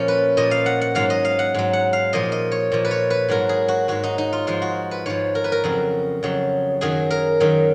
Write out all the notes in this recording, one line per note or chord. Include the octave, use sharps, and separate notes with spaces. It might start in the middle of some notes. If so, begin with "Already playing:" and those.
Already playing: A#2 F3 C#4
B4
A#2 F3 D#5
F5
F#5
F#5
G#2 F#3 F5
D#5
F5
F#5
G#2 F#3
F#5
F5
A#2 F3 D#5
D#5
C#5
A#2 F3
B4
C#5
B4
G#2 F#3 A#4
G#4
F#4
G#2 F#3 F#4
D#4
D#4
F4
G#2 F3 F4
F#4
B4
G#2 F3 C#5
A#4
B4
A#4
F2 C#3 F#3
F2 C#3 F#3
F#2 D#3 F#3 G#4
A#4
F#2 D#3 F#3